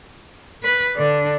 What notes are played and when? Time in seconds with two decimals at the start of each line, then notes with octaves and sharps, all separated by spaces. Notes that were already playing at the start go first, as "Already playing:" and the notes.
0.63 B4
0.97 D3 D4